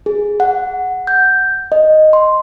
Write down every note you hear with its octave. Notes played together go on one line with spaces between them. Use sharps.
G#4
F#5
G6
D#5
C6